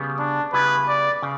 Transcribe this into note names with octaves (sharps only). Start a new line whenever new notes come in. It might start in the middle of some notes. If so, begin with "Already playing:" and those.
Already playing: C#3 G3 B3
D4
C#3 G3 B3 E4 B4
D5
C#3